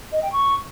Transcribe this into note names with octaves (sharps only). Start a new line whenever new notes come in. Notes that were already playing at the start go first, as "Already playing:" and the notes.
D#5
G5
C#6